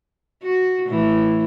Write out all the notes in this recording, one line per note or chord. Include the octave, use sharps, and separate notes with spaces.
F#4
A2 E3